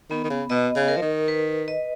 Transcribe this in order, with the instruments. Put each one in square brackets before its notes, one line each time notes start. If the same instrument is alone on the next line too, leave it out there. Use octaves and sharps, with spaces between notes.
[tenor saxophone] D#3 [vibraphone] B3
[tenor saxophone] D#3
C#3
[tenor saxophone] B2 [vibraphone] D#5
[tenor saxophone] C#3
[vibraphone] A#4
[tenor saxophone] F3
D#3
[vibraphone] B4
D#5